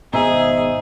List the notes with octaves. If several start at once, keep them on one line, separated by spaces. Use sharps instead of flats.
G#1 B2 D#4 G#4 C5 E5